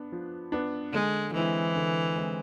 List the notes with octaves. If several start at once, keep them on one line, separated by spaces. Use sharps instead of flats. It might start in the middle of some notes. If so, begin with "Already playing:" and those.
Already playing: B3 D4
F3
B3 D4
D3 G#3
E3 G#3 C4 E4
D3
G#3 C4 E4